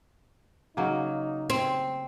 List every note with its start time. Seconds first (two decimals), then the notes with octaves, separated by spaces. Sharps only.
0.77 C#3 F#3 A#3 D#4
1.50 C4